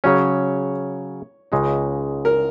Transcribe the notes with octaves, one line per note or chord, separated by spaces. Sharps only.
C#3 F#3 C#4 C#5
C#2 C#3 G#3 D#4
A#4